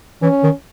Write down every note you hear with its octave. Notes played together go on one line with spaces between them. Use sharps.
E3 C#4
D#3